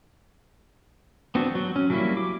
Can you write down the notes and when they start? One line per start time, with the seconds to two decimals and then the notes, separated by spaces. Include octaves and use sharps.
1.35 B3 C4 D4 F#4
1.55 F#3
1.76 C#4
1.90 F#3 G3 A#3 C#4 E4
2.17 D6